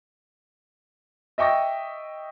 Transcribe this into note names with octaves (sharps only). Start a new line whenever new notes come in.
D#5 E5 G5 C#6 D6 A#6